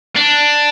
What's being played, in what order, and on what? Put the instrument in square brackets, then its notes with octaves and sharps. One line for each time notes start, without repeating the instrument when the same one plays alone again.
[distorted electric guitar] D4